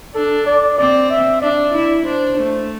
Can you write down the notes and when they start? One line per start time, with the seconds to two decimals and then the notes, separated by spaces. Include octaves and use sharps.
0.15 D4 A4
0.46 D5
0.78 C4 D5
1.10 E5
1.42 D4 D5
1.74 E4
2.05 D4 C5
2.37 A3